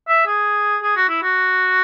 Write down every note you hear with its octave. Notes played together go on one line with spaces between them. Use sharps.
E5
G#4
G#4
F#4
E4
F#4